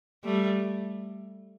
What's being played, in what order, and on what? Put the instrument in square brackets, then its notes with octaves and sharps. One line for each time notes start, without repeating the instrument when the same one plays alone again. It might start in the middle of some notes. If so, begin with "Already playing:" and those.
[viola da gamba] G3 A3